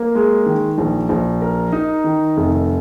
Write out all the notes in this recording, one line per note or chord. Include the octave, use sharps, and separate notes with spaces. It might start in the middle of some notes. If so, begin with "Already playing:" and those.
Already playing: A#3
G#3
D#3
A#1
A#1
A#4
D#4
D#3
F1